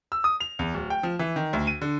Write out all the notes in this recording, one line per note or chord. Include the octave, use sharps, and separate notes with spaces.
E6
D#6
F7
E2
D1
G5
F3
E3
D#3
D2
D#7
D3